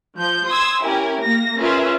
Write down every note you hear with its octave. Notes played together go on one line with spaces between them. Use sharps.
F3 G6
C6 D#6 E6 G#6
C#4 E4 G4 A#4 G#5
A#3 A#6
C#4 F4 G#4 A#4 B4 E5